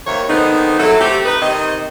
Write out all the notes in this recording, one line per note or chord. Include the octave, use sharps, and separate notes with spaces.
D#2 C3 C#5
D3 D#3 G#3 B3 C4 D#4
F#3 E4 A4
A3 C4 G4
D#4 B4
C3 D#3 C4 D#5